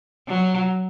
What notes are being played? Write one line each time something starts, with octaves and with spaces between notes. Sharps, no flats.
F#3